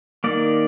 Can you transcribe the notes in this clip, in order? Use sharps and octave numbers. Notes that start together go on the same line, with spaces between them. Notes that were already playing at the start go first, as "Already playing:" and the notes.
D#3 A#3 D5